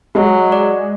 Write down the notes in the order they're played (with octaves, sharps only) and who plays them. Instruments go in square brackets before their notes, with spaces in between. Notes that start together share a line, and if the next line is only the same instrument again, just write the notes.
[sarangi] F#3 [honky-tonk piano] G#3
[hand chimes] D5